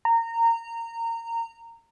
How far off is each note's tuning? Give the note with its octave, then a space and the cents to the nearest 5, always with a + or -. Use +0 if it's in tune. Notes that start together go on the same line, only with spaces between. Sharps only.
A#5 -20